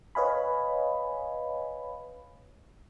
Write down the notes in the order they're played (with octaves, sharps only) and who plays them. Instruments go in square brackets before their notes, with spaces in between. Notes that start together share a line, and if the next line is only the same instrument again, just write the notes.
[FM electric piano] B4 C#5 D#5 F5 G#5 B5